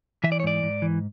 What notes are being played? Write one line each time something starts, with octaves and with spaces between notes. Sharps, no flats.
E3 E5
D5
C#5
G#2 D5
G#2
E3